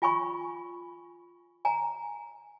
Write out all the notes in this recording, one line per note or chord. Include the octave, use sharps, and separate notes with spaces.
F4 G#5 B5 C#6
G#5 A#5